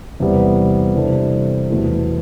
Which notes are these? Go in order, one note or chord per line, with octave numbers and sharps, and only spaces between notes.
E2 C3 G3 B3
C3 E3 G3 D4 A4
E2 B2 A3 E4